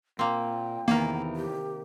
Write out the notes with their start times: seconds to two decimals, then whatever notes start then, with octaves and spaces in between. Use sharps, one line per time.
0.19 A#2 A#3 C4 G5
0.88 E2 C3 D#3 A#3 A#4
1.36 G4